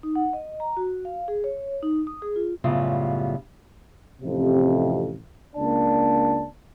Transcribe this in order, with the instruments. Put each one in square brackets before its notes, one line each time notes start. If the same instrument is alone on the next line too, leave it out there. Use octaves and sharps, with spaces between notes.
[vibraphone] D#4
F#5
D#5
A#5
F#4
F5
G#4
C#5
D#4
D#6
G#4
F4
[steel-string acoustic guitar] F#2 A2 C#3 G3 B3 F4
[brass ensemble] A1 F2 C3
C#2 A#3 D4 D5 A5